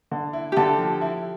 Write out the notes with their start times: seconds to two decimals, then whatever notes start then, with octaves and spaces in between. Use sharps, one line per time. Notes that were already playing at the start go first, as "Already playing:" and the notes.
0.12 D3
0.33 E4
0.52 D3 G4 A4
0.78 F3
1.01 E4